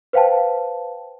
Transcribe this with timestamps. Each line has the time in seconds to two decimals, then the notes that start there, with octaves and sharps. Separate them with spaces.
0.13 B4 C5 F5 G5 A5